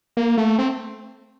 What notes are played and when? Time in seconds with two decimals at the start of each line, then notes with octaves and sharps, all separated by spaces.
0.17 A#3
0.37 A3
0.58 C4